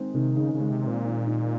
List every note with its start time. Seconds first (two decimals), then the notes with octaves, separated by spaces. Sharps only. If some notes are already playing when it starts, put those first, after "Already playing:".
Already playing: D#3 G#3 C4 D#4
0.14 C3 D#3
0.37 C#3 D#4
0.54 C#3
0.60 G#3
0.71 C3
0.83 A#2 C4
1.04 D#3
1.27 D#4